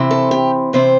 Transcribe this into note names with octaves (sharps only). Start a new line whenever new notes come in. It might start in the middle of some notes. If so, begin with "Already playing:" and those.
Already playing: C3 E3 C4 E4
A4
G4
C3 E3 C4 C5